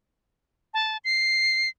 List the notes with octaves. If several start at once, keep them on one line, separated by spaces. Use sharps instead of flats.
A5
C7